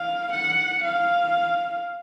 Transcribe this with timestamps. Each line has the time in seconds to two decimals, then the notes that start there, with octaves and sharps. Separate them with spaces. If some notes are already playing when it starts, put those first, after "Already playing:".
Already playing: F5
0.34 F#5
0.85 F5